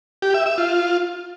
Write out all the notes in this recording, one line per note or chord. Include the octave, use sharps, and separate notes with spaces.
G4
E5
E5
F4